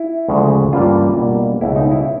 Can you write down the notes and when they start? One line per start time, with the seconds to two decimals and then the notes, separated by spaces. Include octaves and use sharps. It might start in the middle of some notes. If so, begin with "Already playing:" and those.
Already playing: E4
0.28 D2 C#3 F3 G#3
0.73 G2 E3 G3 A#3 C#4 F4
1.17 B2 G3 A#3 D4
1.61 C#2 B2 G3 E4
1.76 D#4
1.92 E4